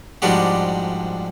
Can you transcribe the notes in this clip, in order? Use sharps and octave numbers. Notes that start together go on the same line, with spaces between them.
G#2 F3 G3 D4 F#4 G4